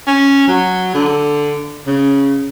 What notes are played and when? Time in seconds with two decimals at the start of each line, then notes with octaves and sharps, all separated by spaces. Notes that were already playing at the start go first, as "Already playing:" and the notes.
0.07 C#4
0.48 F#3
0.94 D3
1.87 C#3